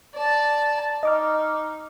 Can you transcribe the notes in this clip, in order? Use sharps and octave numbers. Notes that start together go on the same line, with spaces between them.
D5 A5
D#4 D#5 D6 F6